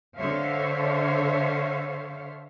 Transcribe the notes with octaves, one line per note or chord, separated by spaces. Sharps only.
D3 A4 C5 C#5 E5 F5